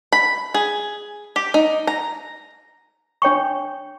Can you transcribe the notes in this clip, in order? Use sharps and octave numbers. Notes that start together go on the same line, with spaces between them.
B5
G#4
G4
D#4
A#5
D4 C#5 G5 C#6